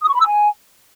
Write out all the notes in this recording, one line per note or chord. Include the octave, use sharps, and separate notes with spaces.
D#6
C#6
B5
E6
G#5